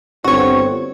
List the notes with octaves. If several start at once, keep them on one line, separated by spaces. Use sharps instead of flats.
G1 G2 C4 F#4 C#5